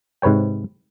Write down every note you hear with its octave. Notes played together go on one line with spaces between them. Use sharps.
G#2 C3 B4 C#5 G5